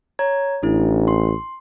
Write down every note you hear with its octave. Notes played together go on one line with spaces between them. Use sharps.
C#5 A#5 G#6
A1 D4 E4
C6